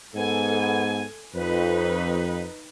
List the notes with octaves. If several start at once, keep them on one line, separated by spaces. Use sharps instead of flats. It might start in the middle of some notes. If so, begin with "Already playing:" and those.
G#2 B3 A4 G#5
F2 D#4 B4